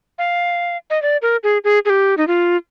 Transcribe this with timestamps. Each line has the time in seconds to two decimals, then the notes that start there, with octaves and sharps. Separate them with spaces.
0.19 F5
0.90 D#5
1.02 D5
1.22 A#4
1.43 G#4
1.64 G#4
1.85 G#4
1.90 G4
2.17 D#4
2.27 F4